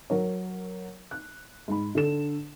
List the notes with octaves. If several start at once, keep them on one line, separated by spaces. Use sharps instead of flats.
F#3 A#4 C#5
F#6
G#2 B5
D3 D4 A4 E7